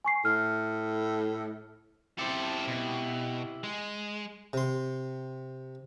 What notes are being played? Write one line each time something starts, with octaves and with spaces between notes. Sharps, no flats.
G#5 C#6 C7
A2 F6
E4 G4 A4 C5
B2
G#3
C3 C6